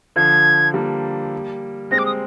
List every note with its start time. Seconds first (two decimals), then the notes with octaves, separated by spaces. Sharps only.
0.16 D3 F3 G#6
0.74 G3 A#3
1.91 G#3 C4 A#6
1.99 D6
2.06 D#6